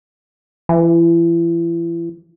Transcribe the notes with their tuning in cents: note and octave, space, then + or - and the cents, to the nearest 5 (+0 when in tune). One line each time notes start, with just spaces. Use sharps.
E3 +35